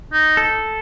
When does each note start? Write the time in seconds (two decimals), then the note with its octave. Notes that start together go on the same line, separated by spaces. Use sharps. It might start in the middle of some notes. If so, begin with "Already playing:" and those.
0.13 D#4
0.37 A4